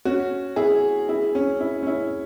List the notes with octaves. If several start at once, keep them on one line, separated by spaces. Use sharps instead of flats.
C#4 F#4
E4 G#4
E4 G#4
C#4
E4
C#4
E4